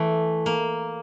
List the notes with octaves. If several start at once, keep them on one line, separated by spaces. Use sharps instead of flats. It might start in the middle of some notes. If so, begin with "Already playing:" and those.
Already playing: E3 A3
A#3